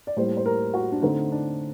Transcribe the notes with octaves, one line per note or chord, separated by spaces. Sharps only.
D5
A2 G3 A#3 C5
C5
A#4
F#4
D4
D3 A3 C4 D#4
D4